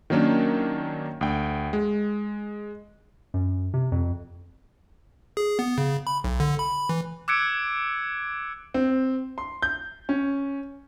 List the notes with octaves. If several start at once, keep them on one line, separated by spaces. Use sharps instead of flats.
D#3 F#3 A#3 C#4 D4
D2 G5
G#3
F#2
C3
F2
G#4
B3
C#3
B5
B1
D3
B5
E3
D6 E6 F#6 G#6 C#7 D7
C4
C6
G6
C#4